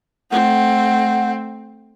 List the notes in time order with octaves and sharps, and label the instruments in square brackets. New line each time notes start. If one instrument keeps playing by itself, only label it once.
[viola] A3 C4 [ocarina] F#5